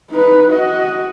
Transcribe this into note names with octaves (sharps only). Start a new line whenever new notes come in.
D#4 B4
F#4 D#5